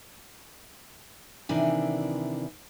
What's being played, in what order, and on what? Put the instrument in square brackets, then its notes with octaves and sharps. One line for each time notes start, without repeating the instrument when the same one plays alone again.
[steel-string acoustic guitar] C3 D#3 E3 D4